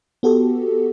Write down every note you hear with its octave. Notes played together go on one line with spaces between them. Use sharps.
B3 F#4 G4 A4